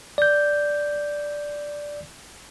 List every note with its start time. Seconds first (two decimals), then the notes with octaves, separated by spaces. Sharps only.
0.18 D5 G6